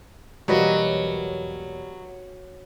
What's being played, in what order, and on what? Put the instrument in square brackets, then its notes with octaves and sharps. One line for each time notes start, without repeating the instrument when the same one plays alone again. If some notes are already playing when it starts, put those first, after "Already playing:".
[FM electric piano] B1 E2 A#3 [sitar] F#3 [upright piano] G3 [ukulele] F#4 B4 D#5